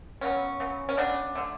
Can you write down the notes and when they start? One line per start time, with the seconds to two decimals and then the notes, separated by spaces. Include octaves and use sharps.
0.21 C#3 F#3 B3 C#4
0.60 C#3 F#3 B3
0.89 C#4
0.97 C#3 F#3 B3 D4
1.35 D3 A3